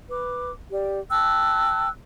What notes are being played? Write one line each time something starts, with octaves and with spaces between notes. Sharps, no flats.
B4 D6
G4 D5
G5 A5 E6 F#6